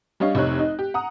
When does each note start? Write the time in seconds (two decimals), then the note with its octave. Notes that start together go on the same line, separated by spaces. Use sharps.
0.20 G3 D4 C#5 D#5 F5
0.35 F1 C3 D#4 C#5 F#6
0.59 D#4
0.79 G4
0.94 F#5 A#5 D#6